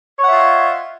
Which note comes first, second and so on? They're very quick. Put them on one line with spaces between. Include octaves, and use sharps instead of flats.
C#5 F#5 E5 F4 D#5